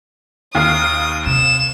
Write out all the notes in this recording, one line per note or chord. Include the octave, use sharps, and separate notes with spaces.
D#2 F5 D#6 F6
C3 E7